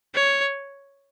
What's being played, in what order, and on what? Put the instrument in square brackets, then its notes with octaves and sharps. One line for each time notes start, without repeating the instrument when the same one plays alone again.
[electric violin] C#5